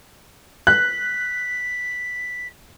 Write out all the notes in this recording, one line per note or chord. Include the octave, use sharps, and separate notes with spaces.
F#6 B6